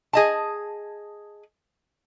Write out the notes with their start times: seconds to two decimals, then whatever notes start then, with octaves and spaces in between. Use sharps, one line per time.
0.13 G#4 D#5 A5